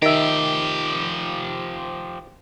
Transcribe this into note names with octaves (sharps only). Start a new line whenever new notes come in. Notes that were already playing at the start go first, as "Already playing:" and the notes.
D#3 F3 G4 E5